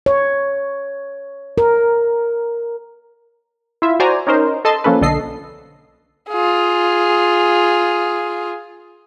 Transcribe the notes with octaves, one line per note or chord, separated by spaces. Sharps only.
C#5
A#4
E4 F4 E5
F#4 C5 D5 G#5 A#5
C#4 D#4 A#4 C5
A4 D#5 A5 C6
F3 A#3 C#4 A4 B4
B1 D3 A4 D#5 C7
F4 G#4